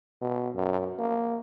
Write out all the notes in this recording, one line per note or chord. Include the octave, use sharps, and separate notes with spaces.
B2
F#2
A#3